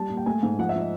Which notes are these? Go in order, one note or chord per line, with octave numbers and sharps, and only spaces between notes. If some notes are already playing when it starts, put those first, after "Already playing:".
Already playing: G3 A5
A#2
G5
A3 G#5
G#2
F3 F#5
E5
F3 D#5